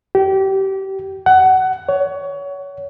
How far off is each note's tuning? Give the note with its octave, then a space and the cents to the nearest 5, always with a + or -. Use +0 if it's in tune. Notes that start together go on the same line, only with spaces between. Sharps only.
G4 -25
F#5 +20
C#5 +25